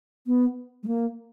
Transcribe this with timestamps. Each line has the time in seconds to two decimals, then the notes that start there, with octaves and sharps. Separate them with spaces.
0.27 B3
0.83 G#3
0.87 A#3